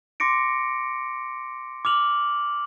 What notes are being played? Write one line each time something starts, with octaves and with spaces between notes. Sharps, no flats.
C6 D6 A#6 C#7 D7
D6 F6 F7 F#7